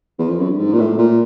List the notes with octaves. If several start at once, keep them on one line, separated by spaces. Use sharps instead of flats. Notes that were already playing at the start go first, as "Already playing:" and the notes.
E2
F2
F#2
G2
G#2
A#2
A2
A#2